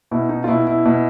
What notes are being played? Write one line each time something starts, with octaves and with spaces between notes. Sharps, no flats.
B2 E4
D#4
F4
B2 E4
E4
B2